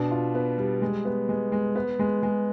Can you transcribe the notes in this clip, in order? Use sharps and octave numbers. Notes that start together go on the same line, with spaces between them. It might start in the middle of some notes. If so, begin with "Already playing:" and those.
Already playing: B2 D4
F4
B3
G3
G#3
B3
G#3
G#3
B3
G#3
G#3